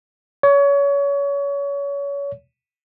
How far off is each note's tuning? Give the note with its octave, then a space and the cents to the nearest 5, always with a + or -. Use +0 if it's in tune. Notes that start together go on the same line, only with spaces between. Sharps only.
C#5 +30